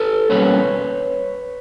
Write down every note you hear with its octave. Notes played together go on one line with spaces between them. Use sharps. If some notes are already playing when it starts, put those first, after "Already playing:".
Already playing: A4 B4
B2 G3 A#3 C#4 B4 C#5